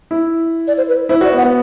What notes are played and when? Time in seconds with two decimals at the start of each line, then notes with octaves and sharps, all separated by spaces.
0.11 E4
0.68 D5
0.78 C5
0.88 B4
1.09 E4 C5
1.21 F#4 D5
1.32 B3
1.38 F#5
1.42 B3